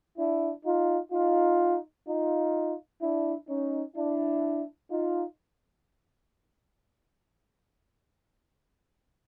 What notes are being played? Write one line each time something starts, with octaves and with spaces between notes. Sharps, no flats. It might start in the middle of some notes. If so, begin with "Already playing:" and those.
D4 E4
D#4 F4
D#4 F4
D#4 F4
D4 E4
C#4 D#4
D4 E4
D#4 F4